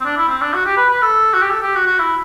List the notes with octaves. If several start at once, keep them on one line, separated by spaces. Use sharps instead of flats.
C4
D4
E4
C4
D4
F#4
G4
B4
B4
A4
F#4
G4
A4
G4
F#4
F#4
E4